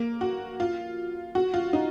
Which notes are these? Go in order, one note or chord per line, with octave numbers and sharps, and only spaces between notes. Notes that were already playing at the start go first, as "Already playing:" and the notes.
Already playing: A#3
F#4
F4
F#4
F4
D#4